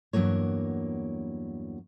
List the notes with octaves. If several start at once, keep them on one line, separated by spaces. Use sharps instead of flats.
E2 G2 A#2 F#3 A#3 C#5